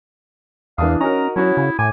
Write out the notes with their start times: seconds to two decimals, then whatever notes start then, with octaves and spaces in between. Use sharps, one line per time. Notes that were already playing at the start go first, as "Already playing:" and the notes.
0.78 E2 E3 D4 F5 D#6
1.01 C#4 D#4 F#4 A#4 A#5
1.36 F#3 C#4 E4 F#4 C#5
1.57 C#3
1.79 A2 G#5 D6